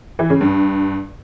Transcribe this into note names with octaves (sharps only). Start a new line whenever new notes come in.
E3
C#3
G2